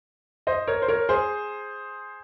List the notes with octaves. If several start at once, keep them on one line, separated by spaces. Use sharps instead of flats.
C5 D#5
A#4 C#5
C5
A#4 C#5
G#4 C5